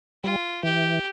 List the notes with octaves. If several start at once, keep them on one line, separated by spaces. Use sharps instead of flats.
G3 F4
E3 G4